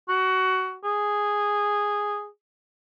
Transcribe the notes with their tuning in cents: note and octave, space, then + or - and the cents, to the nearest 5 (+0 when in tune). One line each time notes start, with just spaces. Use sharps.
F#4 +20
G#4 -5